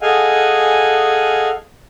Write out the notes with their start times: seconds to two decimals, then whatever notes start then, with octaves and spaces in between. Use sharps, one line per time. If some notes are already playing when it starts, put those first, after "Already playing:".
0.01 G#4 A4 D#5 F5 F#5 G#5